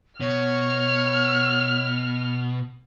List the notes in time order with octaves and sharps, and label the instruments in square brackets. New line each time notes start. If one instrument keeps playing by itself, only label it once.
[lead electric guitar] B2 [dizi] C#5 [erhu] F6